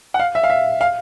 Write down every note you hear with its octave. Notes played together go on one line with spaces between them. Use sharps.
F#5
F5
E5
F5
E5
F5